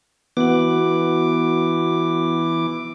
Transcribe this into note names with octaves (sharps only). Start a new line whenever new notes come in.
E3 B3 F#4 F#5 D6